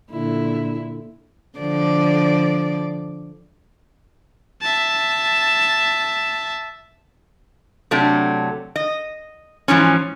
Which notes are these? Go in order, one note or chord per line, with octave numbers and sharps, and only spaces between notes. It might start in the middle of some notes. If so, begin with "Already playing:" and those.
A#2 D3 E4
D3 F3 D5
E5 A5
C3 F#3 A3 D4
D#5
G#2 E3 F3 C#4